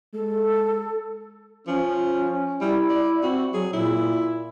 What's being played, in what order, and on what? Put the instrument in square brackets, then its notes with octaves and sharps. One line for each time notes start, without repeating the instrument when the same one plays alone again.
[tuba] G#3 [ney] A4
[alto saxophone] F3 [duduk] C#4
[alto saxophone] G3 [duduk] E4
[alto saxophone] D5
[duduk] C4 [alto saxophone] F#4
[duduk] F#3 [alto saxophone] G#4
[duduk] A#2 [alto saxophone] E4